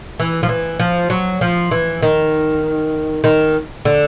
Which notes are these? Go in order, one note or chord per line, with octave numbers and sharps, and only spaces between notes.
E3
F3
E3
F3
F#3
F3
E3
D#3
D#3
D3